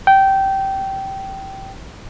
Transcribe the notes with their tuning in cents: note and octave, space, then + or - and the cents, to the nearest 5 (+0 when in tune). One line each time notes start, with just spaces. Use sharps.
G5 -15